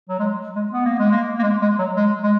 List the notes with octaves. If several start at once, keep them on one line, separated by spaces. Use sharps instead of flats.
F#3
G#3
G#3
B3
A#3
G#3
A#3
A#3
G#3
G#3
F#3
G#3
G#3